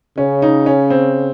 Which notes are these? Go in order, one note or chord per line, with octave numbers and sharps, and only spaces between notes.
C#3 C#4
D#4
C#4
C4